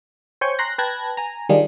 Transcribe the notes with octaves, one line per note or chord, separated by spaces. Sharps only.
C5 C#5 G5 G#5 C#6 G6
A#5 C6 F#6 A#6
B4 G5 A5 F#6 G#6 A#6
G#5 A#5
D#3 G3 D4 F4 G#4